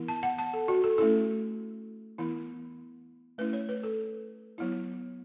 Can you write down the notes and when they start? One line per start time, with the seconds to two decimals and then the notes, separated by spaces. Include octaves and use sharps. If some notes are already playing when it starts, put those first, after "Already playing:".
Already playing: E3 B3 E4
0.09 A5
0.23 F#5
0.39 A5
0.53 A4
0.68 F#4
0.84 A4
0.98 A3 C#4 E4 A4
2.18 E3 B3 E4
3.38 A3 C#4 E4 B4
3.53 C#5
3.69 B4
3.83 A4
4.58 F#3 B3 E4